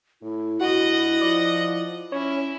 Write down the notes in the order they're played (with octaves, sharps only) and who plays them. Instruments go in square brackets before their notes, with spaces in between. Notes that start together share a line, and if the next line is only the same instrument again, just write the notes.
[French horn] A2 [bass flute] E4
[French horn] G2 [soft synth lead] F#4 [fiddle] D#5 F#5
[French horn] F3 [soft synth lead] D5
[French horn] C#4 [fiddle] E4 [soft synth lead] C#5